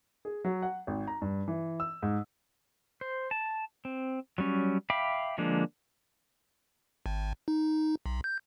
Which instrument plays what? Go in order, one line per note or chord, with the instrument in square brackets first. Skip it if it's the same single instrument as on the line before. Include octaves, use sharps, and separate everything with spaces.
[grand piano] G#4
F#3
F#5
G#1
A#5
G2
E3
E6
G#2
[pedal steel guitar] C5
A5
C4
F#3 G3 C#4
E5 F5 G5 B5 D6
D3 F3 G#3 A#3 D4
[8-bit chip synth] G#1
D#4
B1
G6